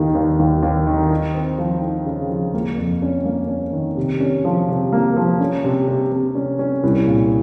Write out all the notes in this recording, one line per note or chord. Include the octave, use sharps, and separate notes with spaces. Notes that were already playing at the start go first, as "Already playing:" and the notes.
Already playing: D#2 D#3
D#2
D#2
D#2
D#3
D#4
C4
F3
D#4
C#3
F3
A#3
F2
C#4
A#3
C#4
D#3
C3
C#4
F3
C3
A#3
F3
C#4
C3
C3
C3
C#4
C#4
C2
A#2